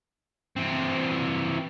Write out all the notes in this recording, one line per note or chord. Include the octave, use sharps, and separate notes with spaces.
E3 C4